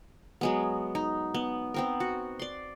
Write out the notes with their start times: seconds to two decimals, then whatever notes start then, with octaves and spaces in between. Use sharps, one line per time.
0.41 F#3 G#3 B3
0.95 D#4
1.34 B3
1.74 B3 C4 A#4
2.00 F#4
2.39 D5 C6